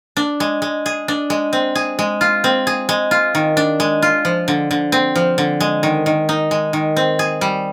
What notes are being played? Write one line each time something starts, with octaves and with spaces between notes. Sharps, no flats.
D4
G#3
G#3
G#4
D4
G#3
C4
G#4
G#3
F4
C4
G#4
G#3
F4
D#3
D4
G#3
F4
F3
D3
D3
C4
F3
D3
G#3
D#3
D#3
D#4
G#3
D#3
C4
G#4
G3